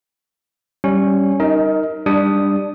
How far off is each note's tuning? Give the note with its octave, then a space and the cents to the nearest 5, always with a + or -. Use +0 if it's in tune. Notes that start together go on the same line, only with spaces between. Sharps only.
G3 -10 C#4 +0 C#6 +0
D#4 +0 A#4 +0 D#5 +30
G3 +15 D4 +0 D#6 +0